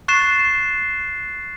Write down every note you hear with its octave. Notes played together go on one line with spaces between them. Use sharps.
C#6 F#6 A6 C7 E7